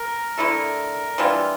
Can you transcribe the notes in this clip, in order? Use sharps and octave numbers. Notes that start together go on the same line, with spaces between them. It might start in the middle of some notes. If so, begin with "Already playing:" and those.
Already playing: A#4
D3 A3 E4 A4
E3 G3 D4 F4